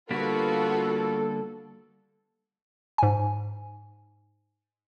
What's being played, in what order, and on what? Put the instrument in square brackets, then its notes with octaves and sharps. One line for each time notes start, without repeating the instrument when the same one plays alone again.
[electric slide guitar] D3 G3 A#3 [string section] B3 F4 F#4 [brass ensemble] A4
[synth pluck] G#2 G#5